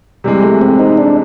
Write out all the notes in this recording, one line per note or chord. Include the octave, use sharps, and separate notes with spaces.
C3 E3 G3 G#3
A3
C4
D#4
D4